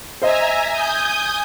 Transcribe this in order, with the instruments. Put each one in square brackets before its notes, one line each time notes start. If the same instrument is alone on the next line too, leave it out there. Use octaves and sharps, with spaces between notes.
[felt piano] C5 D#5 [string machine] E5 G#5 A#5
[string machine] G#5 D#6 G6